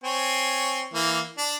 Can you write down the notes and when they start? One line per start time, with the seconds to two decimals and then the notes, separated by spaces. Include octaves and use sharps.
0.04 C4 C#5 G#5
0.94 E3 A#3
1.38 D4